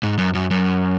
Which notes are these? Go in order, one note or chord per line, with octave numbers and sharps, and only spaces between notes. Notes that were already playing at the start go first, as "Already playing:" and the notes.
G#2
F#2
F#2
F#2